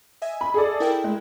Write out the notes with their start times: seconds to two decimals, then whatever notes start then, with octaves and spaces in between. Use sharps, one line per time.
0.22 D#5 E5 G#5
0.41 B5
0.54 G#4 A4 D5
0.80 E4 A#4 G5
1.04 G#3